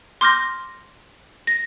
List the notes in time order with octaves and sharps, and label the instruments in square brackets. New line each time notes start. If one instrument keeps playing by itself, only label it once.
[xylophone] C6 D6 F6 G6 A#6
A#6